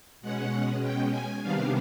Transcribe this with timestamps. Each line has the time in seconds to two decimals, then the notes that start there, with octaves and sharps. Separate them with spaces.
0.21 B2 G#3 C#4 F#5
0.81 G5
1.11 G#5
1.42 C3 D#3 G3 B3 D4 F5